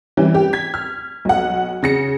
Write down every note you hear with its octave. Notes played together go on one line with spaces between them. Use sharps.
E3 G3 C#4
G4
G#6 B6
F6
B1 F#5
C#3 A#6 C#7